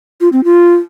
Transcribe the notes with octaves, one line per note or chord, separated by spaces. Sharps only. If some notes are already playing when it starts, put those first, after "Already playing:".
F4
C4
F4